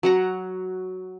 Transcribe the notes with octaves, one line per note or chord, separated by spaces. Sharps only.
F#3 F#5 A#5